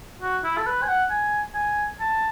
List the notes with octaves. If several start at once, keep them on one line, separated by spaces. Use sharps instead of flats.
F#4
E4
A4
B4
G#5
F#5
G#5
G#5
A5